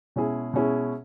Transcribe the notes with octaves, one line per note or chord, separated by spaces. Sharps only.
B2 G#3 C#4 E4 G#4
B2 G#3 C#4 E4 G#4